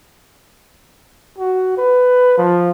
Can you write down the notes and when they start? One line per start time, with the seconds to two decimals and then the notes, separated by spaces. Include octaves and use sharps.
1.38 F#4
1.78 B4
2.38 F3